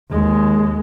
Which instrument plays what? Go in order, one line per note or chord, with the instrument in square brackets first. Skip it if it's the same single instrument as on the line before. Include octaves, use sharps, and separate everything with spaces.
[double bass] D#2 G#3